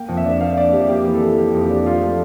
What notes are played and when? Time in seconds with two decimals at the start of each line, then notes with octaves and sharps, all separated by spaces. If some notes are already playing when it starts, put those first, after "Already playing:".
Already playing: A#3 G5
0.09 F2
0.17 E5
0.25 D4
0.41 A#3 F5
0.57 D4 D5
0.73 F2 G4
0.89 A#3 G4
1.05 E3
1.14 A4
1.22 E3
1.38 A#3 G4
1.54 F2
1.61 G4
1.70 D4
1.85 F3 F4
2.02 A3